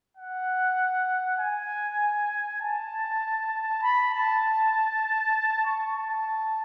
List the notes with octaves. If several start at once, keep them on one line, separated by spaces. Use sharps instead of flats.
F#5
G#5
A5
B5
A5
C#6
A5